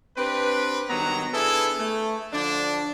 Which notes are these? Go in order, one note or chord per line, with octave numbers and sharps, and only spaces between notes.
C4 D4 G4 B4
G2 D#3 F#3 B3 A#5
B3 D4 E4 G#4 A4
A3
D3 F3 D4